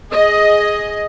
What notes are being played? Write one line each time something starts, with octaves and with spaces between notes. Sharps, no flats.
G#4 D#5